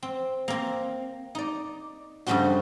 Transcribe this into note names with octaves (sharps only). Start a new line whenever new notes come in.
C4
A#3 C4
D#4 D5
G2 C#3 G3 A3 C4 F#4